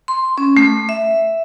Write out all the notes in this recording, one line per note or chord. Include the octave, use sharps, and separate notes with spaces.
C6
C#4
A3
E5